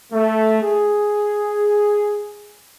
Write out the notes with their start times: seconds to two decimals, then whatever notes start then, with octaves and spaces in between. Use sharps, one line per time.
0.13 A3
0.62 G#4